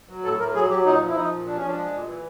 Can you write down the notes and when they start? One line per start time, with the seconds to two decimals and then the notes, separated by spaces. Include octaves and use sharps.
0.09 F#3
0.24 A2 A4
0.39 A2 A#4
0.55 F#3 G#4
0.70 F#3 G4
0.85 A#2 D#4
1.00 F3
1.08 E4
1.15 F3 D#4
1.31 A#2
1.46 F3 D4
1.56 C#4
1.62 F3
1.67 D4
1.76 G#3
1.92 A#2
2.07 E3